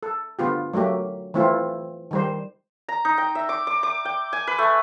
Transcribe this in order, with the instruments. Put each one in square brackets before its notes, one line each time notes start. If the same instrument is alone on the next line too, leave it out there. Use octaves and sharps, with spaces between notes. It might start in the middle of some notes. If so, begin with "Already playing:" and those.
[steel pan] A4
D3 B3 F4 G4
F#3 A3 A#3 G4
E3 A3 C4 E4 F4
D#3 G3 C5
[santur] A#5
D#4
G5
E5
D6
D6
D6
G5
G#5
B4
A3